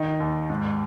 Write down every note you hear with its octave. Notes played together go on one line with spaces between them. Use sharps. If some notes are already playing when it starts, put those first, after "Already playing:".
Already playing: D#3 D#4
D#2
G#2